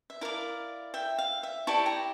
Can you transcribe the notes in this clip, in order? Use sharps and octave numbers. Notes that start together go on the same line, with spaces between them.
E5
E4 A#4 D5 F5
E5 G5
F5
E5
E4 G4 D5 A5 C#6
G5 A#5